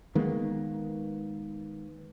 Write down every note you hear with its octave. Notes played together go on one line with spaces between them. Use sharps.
D#3 G#3 A#3 B3